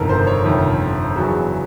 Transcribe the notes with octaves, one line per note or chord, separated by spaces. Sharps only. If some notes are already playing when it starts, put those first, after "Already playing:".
Already playing: G1 F2 C3 D#3 A4 A#4
C5
C#5
G1 F2 C3 D#3
E2 C#3 F#3